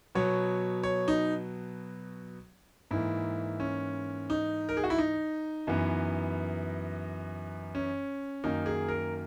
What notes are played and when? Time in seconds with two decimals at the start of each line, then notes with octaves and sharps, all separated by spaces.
0.15 B2 F#3 B3 C#5
0.83 C#5
1.08 D#4
2.91 G#2 E3 A#3 E4
3.60 C#4
4.30 D#4
4.69 A#4
4.77 G#4
4.84 F#4
4.90 E4
4.98 D#4
5.67 F#2 E3 B3
7.75 C#4
8.44 F#2 D#3 A#3 D#4
8.66 G#4
8.88 A#4